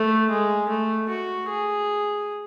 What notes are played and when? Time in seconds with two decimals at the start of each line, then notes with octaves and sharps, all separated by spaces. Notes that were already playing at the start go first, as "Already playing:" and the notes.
Already playing: A3
0.30 G#3
0.69 A3
1.09 F#4
1.49 G#4